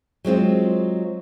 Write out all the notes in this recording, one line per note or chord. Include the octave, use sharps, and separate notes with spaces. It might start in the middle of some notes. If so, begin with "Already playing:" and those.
F#3 G#3 C4 F4